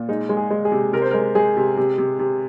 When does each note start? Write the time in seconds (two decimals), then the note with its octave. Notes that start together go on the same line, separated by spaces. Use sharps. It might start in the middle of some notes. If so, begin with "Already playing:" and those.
Already playing: A#2
0.09 G#3 D#4
0.29 G#3
0.37 G#4
0.51 G#3
0.65 G#4
0.72 C3
0.93 C3 A#4
1.02 C5
1.11 G#3 A#4
1.35 G#3 G#4
1.57 C3
1.77 C3
1.98 C3
2.19 C3